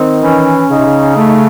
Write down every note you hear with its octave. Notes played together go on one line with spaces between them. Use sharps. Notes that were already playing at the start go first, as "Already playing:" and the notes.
Already playing: D#3 C4
E3 C#4
C#3 D#4
C3
C#3
A3